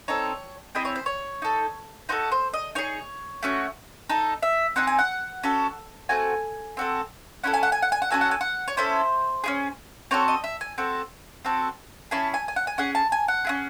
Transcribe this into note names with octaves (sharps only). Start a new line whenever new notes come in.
C4 D#4 A4 C#5
C4 E4 G#4 D#5
C#5
C5
C#5
D#4 A4
D#4 F#4 A4 C5
C5
D#5
D#4 G#4 C#5
A3 C#4 F#4
D#4 A4
E5
C4 D#4 G#4 F#5
G#5
F#5
C#4 F#4 A4
A3 C4 F#4 G#5
C4 F#4 A4
C#4 E4 A4 F#5
G#5
F#5
G#5
F#5
G#5
F#5
C#4 F#4 A4 G#5
F#5
G#5
F#5
C#5
C#4 E4 A4 C5
C#4 E4 G#4
C4 F#4 A4 C#5
D#5
E5
G#5
C4 F#4 A4
C4 F#4 A4
C#4 E4 G#4 A5
G#5
G#5
F#5
G#5
C#4 G#4 F#5
A5
G#5
F#5
C#4 E4 G#4